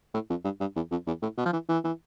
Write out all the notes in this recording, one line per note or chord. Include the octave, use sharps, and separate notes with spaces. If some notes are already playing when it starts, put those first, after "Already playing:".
A2
F2
G2
G2
E2
F2
E2
A2
B2
F3
E3
E3
E3